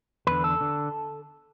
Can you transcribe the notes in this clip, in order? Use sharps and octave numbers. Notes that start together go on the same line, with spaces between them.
E2 D3 B4
A4
D3